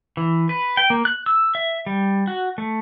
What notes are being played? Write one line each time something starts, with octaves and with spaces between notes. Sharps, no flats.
E3
B4
G5
A#3
F#6
E6
E5
G3
F#4
A3